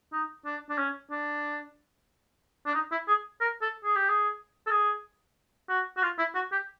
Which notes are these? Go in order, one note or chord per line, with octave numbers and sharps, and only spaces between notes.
D#4
D4
D4
C#4
D4
D4
D#4
E4
G#4
A#4
A4
G#4
G4
G#4
A4
G#4
F#4
F#4
F4
E4
F#4
G4